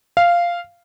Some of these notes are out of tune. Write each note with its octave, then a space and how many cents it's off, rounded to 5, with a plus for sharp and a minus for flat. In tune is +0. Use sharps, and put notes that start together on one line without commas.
F5 -10